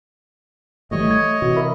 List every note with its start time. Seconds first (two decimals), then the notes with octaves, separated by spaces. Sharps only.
0.91 G#1 E3 G3 A3 C#5 D#5
1.11 A3 G#6
1.42 C3 E3 F#4
1.57 A#4 E5 B5